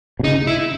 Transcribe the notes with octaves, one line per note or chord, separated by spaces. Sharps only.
B2
C#3 D#4
E4